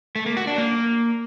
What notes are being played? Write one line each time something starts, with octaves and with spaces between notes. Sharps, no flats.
A3
A#3
F#4
D4
A#3